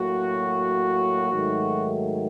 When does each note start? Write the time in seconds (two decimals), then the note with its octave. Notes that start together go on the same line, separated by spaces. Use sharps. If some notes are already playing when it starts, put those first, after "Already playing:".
Already playing: A2 F#3 A#3 F#4
1.31 G#2 D#3 F#3 A3